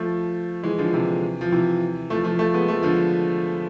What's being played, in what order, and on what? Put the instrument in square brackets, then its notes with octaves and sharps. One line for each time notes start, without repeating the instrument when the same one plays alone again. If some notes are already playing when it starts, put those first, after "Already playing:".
Already playing: [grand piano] F3 A3
E3 G#3
D3 F3
C3 E3
F3
C3 E3
F3 A3
F3 A3
F3 A3
G#3 B3
F3 A3
D3 F3